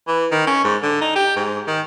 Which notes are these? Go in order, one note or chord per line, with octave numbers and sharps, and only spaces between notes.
E3
D#3
C#4
G#2
D3
D#4
G4
G#2
D#3